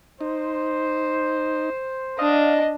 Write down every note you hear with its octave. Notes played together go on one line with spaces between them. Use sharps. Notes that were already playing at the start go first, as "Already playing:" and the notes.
D#4 C5
D4 D#5 F5